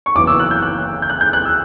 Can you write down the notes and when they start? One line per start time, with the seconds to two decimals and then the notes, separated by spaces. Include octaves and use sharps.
0.06 C#6
0.15 F#1 F#2 E3 B3 D6
0.27 E6
0.40 F#6
0.51 G6
0.62 F#6
1.02 G6
1.10 F#6
1.21 G6
1.33 F#6
1.45 E6